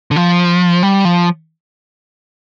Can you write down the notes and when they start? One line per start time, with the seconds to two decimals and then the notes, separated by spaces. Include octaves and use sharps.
0.11 D3
0.16 F3
0.83 G3
1.05 F3